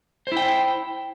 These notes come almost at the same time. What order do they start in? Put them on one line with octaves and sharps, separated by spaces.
C5 E4 G5